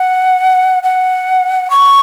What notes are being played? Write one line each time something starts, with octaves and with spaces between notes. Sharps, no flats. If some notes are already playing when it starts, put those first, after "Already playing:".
Already playing: F#5
F#5
C#6